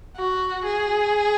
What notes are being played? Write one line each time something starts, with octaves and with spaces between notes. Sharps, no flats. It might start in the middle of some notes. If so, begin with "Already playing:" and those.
F#4
G#4